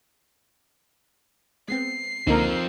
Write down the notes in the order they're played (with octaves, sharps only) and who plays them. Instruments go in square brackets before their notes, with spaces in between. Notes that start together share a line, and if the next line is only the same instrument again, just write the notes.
[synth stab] G#3 B3 C4 [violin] C7
[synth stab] C#2 D3 A#3 [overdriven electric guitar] F3 C4 [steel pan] D#4 A#4